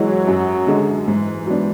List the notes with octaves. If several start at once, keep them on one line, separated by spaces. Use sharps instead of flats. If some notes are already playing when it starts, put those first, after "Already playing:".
Already playing: G#2 E3 F#3 G#3
F#2
D3 G#3
G#2 E3
F#3 B3 D4